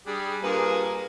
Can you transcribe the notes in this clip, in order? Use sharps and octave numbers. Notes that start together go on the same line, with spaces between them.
G3 D4 G4 G#4
G2 A#2 A#3 G#4 A#4 B4